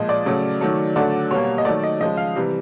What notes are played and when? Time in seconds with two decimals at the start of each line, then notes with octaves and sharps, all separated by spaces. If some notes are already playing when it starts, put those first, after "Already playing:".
Already playing: A#2 F3 G#3 D#5
0.09 D5
0.26 C#3 F#3 A3
0.61 D#3 F#3 A3
0.96 D3 F#3 A3 D5
1.30 B2 G3 A#3 C#5
1.58 D#5
1.65 D#3 F#3 A3 D5
1.83 D#5
2.00 C#3 F3 G#3 D#5
2.17 F5
2.36 C3 E3 G3